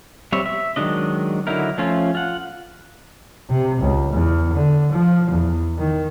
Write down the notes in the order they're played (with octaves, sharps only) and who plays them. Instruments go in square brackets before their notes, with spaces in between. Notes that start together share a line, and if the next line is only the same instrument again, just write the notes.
[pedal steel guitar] G3 C4 C#5 E5
E5
D#3 F#3 G#3 D4 D#5
D3 F#3 D#4 E4 A#4
F3 A3 C#4 F4
F4 F#5
[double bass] C3
C#2
E2
D3
F3
E2
D#3